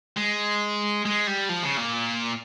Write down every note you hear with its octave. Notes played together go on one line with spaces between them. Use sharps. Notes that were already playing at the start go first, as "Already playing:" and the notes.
G#3
G#3
G3
F3
C#3
A#2